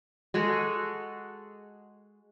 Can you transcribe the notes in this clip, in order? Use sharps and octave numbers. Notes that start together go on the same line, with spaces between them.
G#3 F#4 G#4 A4